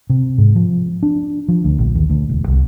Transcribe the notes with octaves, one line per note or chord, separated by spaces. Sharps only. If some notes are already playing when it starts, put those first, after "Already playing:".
C3
G#2
F3
D4
F3
D2
A#1
D#2
D2
E1
C2